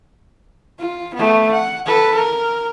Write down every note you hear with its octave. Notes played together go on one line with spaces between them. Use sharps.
F4
A3 B3
F#5
A4 B4
A#4